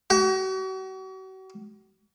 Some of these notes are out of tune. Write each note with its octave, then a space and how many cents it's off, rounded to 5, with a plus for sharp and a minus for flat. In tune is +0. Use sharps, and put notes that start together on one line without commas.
F#4 +40